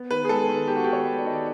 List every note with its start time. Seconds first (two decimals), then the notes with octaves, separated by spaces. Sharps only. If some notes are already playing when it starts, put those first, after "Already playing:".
Already playing: B3
0.10 D#3 B4
0.25 G#4
0.29 G#3 A4
0.49 D#3
0.67 B3 G4
0.76 F#4
0.84 G4
0.87 D#3
0.93 C#5
1.06 G#3
1.18 D5
1.25 D#3 D#5
1.33 D5